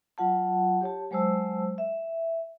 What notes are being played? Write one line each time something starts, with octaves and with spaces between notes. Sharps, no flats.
F#3 F4 F#5 A5
G4 C#5 A5
F#3 G#3 C5 A5 E6
E5